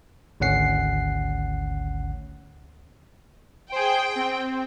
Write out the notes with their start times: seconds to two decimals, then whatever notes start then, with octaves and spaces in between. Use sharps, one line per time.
0.40 G#1 D2 C#4 F#5 C7
3.72 G#4 C5 G5
4.16 C4